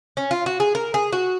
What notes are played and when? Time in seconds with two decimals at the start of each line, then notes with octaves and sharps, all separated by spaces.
0.17 C#4
0.31 F4
0.46 F#4
0.60 G#4
0.75 A#4
0.94 G#4
1.12 F#4